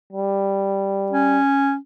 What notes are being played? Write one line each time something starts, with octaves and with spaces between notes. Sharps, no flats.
G3
C#4